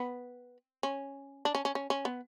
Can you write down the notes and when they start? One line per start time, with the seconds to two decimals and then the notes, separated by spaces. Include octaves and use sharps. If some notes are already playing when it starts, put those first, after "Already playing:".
Already playing: B3
0.83 C#4
1.45 D4
1.55 C#4
1.65 C#4
1.75 C#4
1.90 C#4
2.05 B3